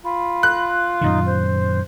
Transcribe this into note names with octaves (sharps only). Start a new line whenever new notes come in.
F4 B5
F#6
F#2 A#2 D#3 D#4
C5